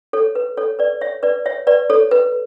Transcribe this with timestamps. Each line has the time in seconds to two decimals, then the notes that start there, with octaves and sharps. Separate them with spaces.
0.13 A4 C#5
0.35 B4
0.57 A4 C#5
0.79 B4 D5
1.01 C#5 E5
1.23 B4 D5
1.46 C#5 E5
1.67 B4 D5
1.90 A4 C#5
2.11 B4